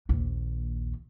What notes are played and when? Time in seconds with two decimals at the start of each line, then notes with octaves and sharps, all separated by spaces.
0.09 A#1 D#2